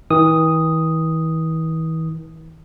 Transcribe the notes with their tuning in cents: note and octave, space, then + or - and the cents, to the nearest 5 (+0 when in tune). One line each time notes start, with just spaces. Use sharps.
E3 -40 D#6 +0